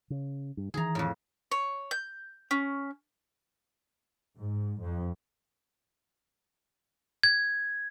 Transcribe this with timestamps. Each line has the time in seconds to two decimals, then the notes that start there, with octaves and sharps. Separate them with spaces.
0.10 C#3
0.57 G2
0.74 D#3 E3 G#4 A#5
0.95 F2 A2
1.52 C#5
1.91 G6
2.51 C#4
4.39 G#2
4.81 F2
7.23 G#6